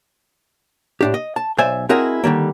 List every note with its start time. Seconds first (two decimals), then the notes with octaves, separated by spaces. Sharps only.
1.01 A2 D4 G4
1.14 D#5
1.36 A5
1.58 B1 C5 D5 E5 G#5
1.89 C4 E4 F#4 G#4 A#4 D#5
2.24 D3 D#3 G3 A#3